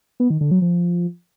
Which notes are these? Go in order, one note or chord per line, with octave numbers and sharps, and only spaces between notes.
B3
D#3
D3
F#3
F3